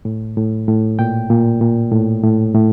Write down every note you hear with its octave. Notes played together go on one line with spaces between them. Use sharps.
A2
A2
A2
A#2 G5
A#2
A#2
A2
A2
A2